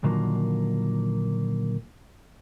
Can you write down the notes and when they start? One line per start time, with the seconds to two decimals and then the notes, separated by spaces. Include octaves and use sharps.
0.04 A#2 D3 D#3 F3 F#3 A#3